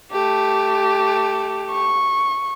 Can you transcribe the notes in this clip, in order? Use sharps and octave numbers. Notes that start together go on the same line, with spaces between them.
A3 G4
C#6